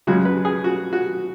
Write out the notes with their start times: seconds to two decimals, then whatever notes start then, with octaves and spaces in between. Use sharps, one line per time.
0.07 F#2 C#3 G#3 F#4
0.25 B4
0.45 G#4
0.64 F#4
0.93 F#4